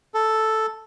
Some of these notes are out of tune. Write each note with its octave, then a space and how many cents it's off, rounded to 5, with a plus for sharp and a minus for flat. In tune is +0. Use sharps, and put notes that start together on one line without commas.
A4 +0